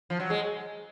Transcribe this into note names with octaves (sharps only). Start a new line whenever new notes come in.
F3
F#3
G#3